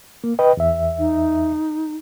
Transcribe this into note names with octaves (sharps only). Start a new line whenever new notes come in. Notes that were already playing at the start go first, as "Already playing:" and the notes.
A#3
B4 D#5 G5
E2 E5
D#4